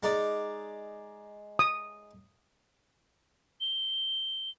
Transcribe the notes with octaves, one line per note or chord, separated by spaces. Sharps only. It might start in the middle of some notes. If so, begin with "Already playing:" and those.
G#3 D#4 D5
D#6
G7